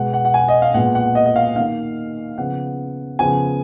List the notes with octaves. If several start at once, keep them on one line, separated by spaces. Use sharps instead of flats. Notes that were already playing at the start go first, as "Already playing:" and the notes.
Already playing: B2 G#3 B3 F#5
F#5
F#5
G#5
D#5
F5
A#2 G#3 B3 F#5
F#5
D#5
D#5
F5
D#3 A#3 F5
C#3 F3 B3 F#5
C#3 F3 B3 G#5